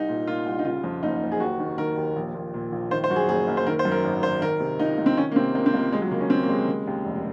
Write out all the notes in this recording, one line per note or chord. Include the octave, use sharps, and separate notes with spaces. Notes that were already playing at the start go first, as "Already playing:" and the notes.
Already playing: C2 D#4
A#2
A#2 F4
C2
D#4
C#3 F4
F2
F#1 D#4
F#1
G#4
D#2 F#4
D#3
D#3 A#4
D#2
A#1
A#2
A#2
A#1
D#3 C5
C5
F#2 F#4
G#4
F#1 G#4
F#1
C5
D#3 A#4
C5
F#2
A#4
G#1
G#1 C5
D#3 A#4
C3
C#2 D#4
C#2
C4
D#3 C#4
A#3
C3 C4
C#2 A#3
C4
C#2 A#3
D#2 G#3
F#3
C#3 A#3
C#4
C#3 C4
A#3
D#2 G#3
C#3
D#2
F1